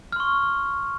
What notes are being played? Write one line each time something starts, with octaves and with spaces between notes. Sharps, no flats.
C6 C#6 F6